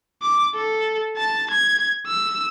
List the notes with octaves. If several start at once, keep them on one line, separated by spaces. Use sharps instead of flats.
D6
A4
A5
G#6
E6